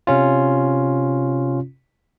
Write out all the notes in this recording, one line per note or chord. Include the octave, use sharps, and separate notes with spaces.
C3 C#4 F4